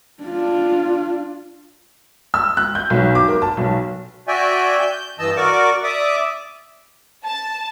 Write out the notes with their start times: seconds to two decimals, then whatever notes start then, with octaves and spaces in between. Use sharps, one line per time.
0.23 D4 F4
2.34 E6
2.57 F#6
2.75 G6
2.90 B1
3.15 D6
3.28 A#4
3.42 A5
3.57 B1
4.28 F#4 D5 E5 G5 G#5
4.78 G6
5.19 G2 E3 D#5 A5 E6
5.37 F#4 A#4 D5 C#6 D6
5.84 D5 E5 D6 D#6
7.26 A5